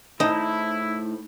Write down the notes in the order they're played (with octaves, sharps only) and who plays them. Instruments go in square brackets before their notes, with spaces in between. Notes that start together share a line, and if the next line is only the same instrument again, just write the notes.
[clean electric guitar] A2 C5 A5 [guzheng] D#4 [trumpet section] E4